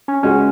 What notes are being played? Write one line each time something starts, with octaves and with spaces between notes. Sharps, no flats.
C#4
C#2 C#3 G#3 C#4 F#4